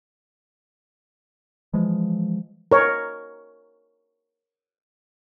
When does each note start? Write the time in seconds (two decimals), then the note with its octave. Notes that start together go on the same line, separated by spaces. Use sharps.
1.74 E3 F3 G#3
2.72 A#4 C#5